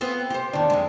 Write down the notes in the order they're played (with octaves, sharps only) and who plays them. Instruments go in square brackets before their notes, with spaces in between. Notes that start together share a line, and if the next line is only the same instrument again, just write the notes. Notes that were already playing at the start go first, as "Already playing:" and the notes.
[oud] B3 C4 F4
G4 C5
[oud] E2 D#3 [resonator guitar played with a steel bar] D4
[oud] F2 G#3